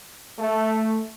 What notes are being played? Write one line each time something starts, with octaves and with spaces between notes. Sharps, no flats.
A3